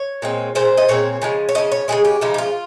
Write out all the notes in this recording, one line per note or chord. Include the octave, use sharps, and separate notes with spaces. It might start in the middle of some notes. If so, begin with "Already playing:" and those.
Already playing: C#5
A#2 G#3 C4
A#2 G#3 C4 C5
D#5
A#2 G#3 C4 C#5
C#3 F3 G#3
C#5
C#3 F3 D#5
C#5
C#3 F3 G#3 G#4
G4
C#3 F3 G#3 D#4
G4
F4